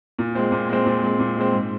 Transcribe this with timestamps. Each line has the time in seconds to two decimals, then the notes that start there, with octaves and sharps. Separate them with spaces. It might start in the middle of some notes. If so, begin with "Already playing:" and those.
0.19 A#2
0.35 G#3 C4
0.52 A#2
0.69 G#3 C4
0.86 A#2
1.03 G#3 C4
1.19 A#2
1.37 G#3 C4
1.53 G#2